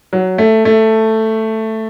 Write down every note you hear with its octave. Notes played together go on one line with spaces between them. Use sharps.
F#3
A3
A3